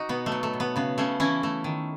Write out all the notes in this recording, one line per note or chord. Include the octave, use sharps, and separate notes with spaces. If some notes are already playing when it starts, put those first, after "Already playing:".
Already playing: D#4 F#4
B2 B3
A3
F#3
A3
B2
B3
C#3 B3
C#3 A3 C#4
E3 C#4 E4
A3
D#3